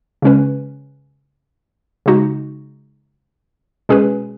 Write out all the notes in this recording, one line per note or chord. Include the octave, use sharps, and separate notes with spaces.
C#3 G#3 C#4 B4
C#3 G#3 D#4 F#4
B2 G#3 C#4 G#4 B4